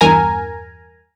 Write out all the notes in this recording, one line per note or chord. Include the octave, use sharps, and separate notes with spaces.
E2 G2 A#4 G#5 A#5